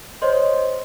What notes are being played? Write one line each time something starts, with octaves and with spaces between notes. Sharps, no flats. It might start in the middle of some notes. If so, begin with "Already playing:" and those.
C5 C#5 D#5 C6